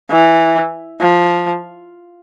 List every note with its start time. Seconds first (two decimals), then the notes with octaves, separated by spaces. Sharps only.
0.10 E3
1.01 F3